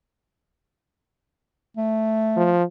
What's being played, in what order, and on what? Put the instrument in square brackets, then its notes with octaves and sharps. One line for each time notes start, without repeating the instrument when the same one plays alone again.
[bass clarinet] A3
[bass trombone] F3